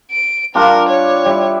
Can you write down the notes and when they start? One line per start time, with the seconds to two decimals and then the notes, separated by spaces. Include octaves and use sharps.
0.10 D7
0.55 G3 D4 F4 A#4
0.89 C#5
1.26 G3 E4